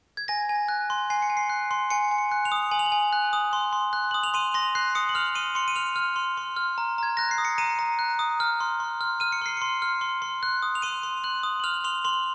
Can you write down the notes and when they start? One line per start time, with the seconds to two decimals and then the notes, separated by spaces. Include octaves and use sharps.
0.17 G#6
0.28 G#5 A#6
0.49 G#5
0.68 F#6
0.90 C6
1.10 G#5 C7
1.22 C#7
1.30 G#5
1.37 C7
1.50 F#6
1.71 C6
1.91 G#5 C#7
2.11 G#5
2.18 C#7
2.32 F#6
2.45 F7
2.52 D#6
2.71 G#5 F#7
2.79 F7
2.86 F#7
2.92 G#5
3.13 F#6
3.33 D#6
3.53 C6
3.73 C6
3.93 F#6
4.11 D#6 F#7
4.23 F7
4.34 C6 D#7
4.54 C6 A#6
4.75 F#6 C7
4.95 D#6 C#7
5.09 F#7
5.15 F6 F7
5.35 C6 D#7
5.55 C6 C#7
5.68 D#7
5.76 F6 F7
5.96 F6
6.16 C6
6.37 C6
6.57 F6
6.78 A#5
6.98 A#5 G#6
7.17 F#6 A#6
7.31 C7
7.38 D#6
7.45 C#7
7.58 A#5 D#7
7.79 A#5
7.99 F#6
8.19 D#6
8.40 F6
8.60 C6
8.80 C6
9.01 F6
9.20 F6 D#7
9.32 C#7
9.42 C6 C7
9.57 C6 C#7
9.82 F6
10.01 C6
10.22 C6
10.43 F#6
10.63 D#6
10.75 F7
10.82 C6 D#7
11.03 C6
11.24 F#6 F#7
11.43 D#6
11.60 F#7
11.64 F6 F7
11.84 C6 F7
12.04 C6 F#7